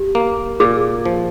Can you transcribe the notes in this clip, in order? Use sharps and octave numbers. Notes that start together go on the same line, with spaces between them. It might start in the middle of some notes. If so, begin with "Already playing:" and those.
Already playing: G4
A#3
A#2 G#4
F3